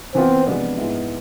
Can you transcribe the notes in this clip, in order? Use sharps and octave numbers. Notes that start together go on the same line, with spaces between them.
E3 B3 C4 F4
C3 F3 G#3 B3 D4
G#2 G#3 B3 E4